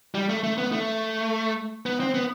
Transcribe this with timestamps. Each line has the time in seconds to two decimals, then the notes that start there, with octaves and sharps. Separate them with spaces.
0.15 G3
0.29 A3
0.43 A3
0.58 B3
0.72 A3
1.86 B3
2.00 C4
2.14 B3